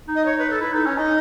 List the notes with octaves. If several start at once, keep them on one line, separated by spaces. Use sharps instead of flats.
D#4
D#5
C#5
B4
A4
E4 B4
D#4 A4
C#4 C#5
D#4 D#5